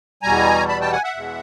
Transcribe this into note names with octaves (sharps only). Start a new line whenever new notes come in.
E2 B2 G3 G#5 A#5
A5 B5
G5 A5
F#5 G#5
E5 F#5
E2 B2 G#3